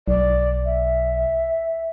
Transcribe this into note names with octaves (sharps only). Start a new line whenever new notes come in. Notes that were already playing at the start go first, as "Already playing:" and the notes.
B1 D5
E5